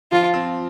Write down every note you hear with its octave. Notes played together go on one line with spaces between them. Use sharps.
F3 F4
C4